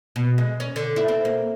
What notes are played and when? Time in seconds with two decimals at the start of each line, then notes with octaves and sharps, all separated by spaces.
0.16 B2
0.38 G#3
0.60 C#4
0.76 D3
0.96 E4
1.08 C4
1.25 A#3